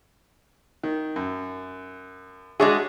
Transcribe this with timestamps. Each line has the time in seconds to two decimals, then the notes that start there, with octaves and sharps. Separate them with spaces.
0.84 D#3
1.16 F#2
2.60 G#3 D4 F#4 G#4 C#5 E5